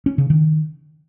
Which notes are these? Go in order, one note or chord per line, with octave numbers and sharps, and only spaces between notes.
C#4
C#3
D#3